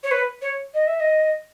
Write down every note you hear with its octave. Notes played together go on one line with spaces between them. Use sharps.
C#5
B4
C#5
D#5
E5
D#5